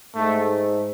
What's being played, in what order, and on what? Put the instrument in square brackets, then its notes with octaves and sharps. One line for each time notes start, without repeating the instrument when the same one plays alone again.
[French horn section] G#2 [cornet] A3